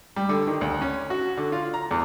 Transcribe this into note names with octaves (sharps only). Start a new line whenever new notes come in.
G3
D3
D#3
D2
C#4
F#4
D3
F4
A#5
E2